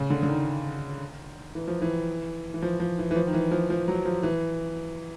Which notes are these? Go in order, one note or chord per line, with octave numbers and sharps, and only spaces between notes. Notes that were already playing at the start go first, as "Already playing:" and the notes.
Already playing: C#3
D3
D3
D#3
E3
F3
E3
E3
F3
F3
E3
E3
F3
D#3
E3
F3
F3
F#3
F3
E3